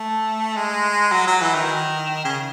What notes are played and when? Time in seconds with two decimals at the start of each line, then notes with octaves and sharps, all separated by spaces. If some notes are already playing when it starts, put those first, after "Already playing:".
Already playing: A3
0.57 G#3
1.13 F#3
1.28 F#3
1.41 E3
1.55 D#3
2.25 C#3